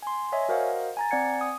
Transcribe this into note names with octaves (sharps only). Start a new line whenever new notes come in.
G#5 C6
C#5 D#5 E5 G#5
F#4 A#4 C5 D#5 F5 F#5
G#5 A#5 A6
C4 D5 F#5 G#5 G#6 C#7
D#6